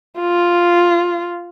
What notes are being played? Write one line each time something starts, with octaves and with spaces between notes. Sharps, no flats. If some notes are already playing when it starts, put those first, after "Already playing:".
F4